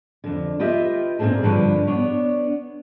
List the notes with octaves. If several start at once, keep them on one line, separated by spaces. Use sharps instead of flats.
F2 D3
F4 G4 B4 D#5 E5
A#2 A#3 C4 D4 G#4 A4
G2 D3 F3 D4 B4 C#5
B3 D4 C#5